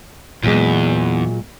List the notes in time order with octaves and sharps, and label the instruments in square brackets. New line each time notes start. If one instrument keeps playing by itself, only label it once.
[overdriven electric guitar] E2 [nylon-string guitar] A#2 F#3 G#3